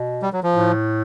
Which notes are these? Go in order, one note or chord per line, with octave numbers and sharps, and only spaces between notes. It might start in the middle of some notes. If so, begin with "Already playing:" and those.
Already playing: B2
G3
F#3
F3
A2